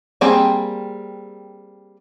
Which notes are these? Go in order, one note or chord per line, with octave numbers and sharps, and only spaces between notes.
G3 A#3 C4 G#4 G5